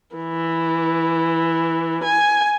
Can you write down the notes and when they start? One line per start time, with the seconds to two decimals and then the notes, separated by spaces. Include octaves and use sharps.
0.16 E3
2.04 G#5